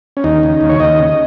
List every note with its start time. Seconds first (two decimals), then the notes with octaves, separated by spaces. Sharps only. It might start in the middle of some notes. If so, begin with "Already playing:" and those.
0.17 C#4
0.24 D#2 D#4
0.43 C#3
0.61 D#2
0.69 C#5
0.80 D#2 D#5
0.99 C#3